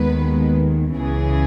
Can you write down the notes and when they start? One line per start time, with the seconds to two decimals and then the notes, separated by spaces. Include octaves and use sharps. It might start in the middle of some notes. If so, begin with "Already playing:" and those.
Already playing: D#2 D#3 G#3 B3 B4
0.97 C#2 C#3 E3 G#4